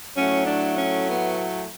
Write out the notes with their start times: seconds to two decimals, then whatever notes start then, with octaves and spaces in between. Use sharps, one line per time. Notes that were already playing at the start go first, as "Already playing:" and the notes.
0.16 A2 F#3 A3 C#4
0.47 D4
0.78 C#4
1.09 B3